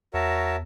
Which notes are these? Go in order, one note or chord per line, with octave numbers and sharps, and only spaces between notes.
E2 F#4 A#4 C#5 E5 A5